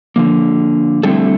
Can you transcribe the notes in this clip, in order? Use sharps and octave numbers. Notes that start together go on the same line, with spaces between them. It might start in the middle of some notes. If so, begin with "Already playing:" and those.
D3 F3 A#3
D3 G3 A3 C4 E4 A4